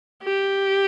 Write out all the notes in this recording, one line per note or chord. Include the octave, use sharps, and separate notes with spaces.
G4